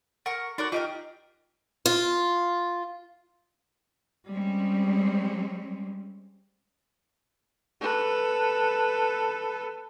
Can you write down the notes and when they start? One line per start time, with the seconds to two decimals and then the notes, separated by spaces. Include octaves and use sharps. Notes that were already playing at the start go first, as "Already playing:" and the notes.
0.26 A#4 F#5 C#6
0.58 D#4 F#4 A#4 D5
0.72 D#4 F4 G4 A#4 D#5
1.86 F4
4.31 G3 G#3 C4 C#4
7.80 A4 B4